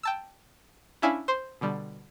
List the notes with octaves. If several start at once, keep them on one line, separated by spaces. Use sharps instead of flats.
G5 A5 E6
C#4 D4 E4 E5 F5 G#5
C5 C6
B2 D3 G3